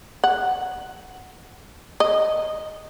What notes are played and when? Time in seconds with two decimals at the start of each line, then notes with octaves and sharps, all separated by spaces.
0.24 F#5
2.00 D#5